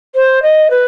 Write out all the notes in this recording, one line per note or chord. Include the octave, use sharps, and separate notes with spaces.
C5
D#5
B4